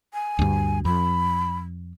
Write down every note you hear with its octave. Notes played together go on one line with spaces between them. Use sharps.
G#5
D2 G2
F2 B5